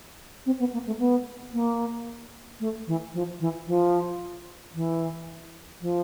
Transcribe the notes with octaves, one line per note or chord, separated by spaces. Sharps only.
C4
B3
A#3
A3
B3
A#3
A3
E3
F3
E3
F3
E3
F3